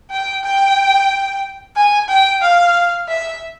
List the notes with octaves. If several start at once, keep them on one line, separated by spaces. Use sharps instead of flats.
G5
G5
G#5
G5
F5
E5